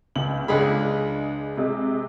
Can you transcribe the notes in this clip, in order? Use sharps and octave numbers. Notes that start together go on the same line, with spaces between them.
C#2 F#7
C#2 G#3 D4 G#4 B5
C3 G#3